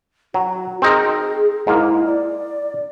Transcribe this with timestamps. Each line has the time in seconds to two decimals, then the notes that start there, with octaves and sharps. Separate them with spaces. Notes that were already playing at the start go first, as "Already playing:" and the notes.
0.34 F#3 F#4
0.82 C4 D#4 G#4 A#4
1.67 G#2 A#3 E4
2.06 D5